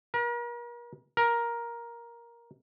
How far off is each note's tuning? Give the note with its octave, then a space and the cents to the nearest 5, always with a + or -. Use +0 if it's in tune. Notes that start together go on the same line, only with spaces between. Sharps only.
A#4 +40
A#4 +10